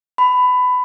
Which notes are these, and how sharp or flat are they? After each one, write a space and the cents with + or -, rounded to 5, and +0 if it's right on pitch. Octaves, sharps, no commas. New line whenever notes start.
B5 +20